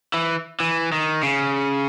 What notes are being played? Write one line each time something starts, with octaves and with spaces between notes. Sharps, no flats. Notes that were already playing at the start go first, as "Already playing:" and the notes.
E3
E3
D#3
C#3